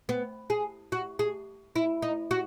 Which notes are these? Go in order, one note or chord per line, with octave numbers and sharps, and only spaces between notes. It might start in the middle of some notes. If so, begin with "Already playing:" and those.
B3
G#4
F#4
G#4
E4
D#4
F#4